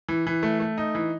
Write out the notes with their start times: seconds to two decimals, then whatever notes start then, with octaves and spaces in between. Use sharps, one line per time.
0.09 E3
0.27 E3
0.43 A3
0.60 A3
0.78 D#4
0.95 E3